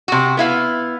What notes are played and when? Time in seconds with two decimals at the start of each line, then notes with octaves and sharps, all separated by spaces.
0.08 C3 F#4
0.37 B3 E4 F5